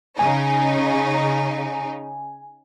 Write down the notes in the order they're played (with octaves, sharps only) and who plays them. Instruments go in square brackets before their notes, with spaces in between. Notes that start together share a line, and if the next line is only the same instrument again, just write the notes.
[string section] C#3 D#4 [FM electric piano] G#5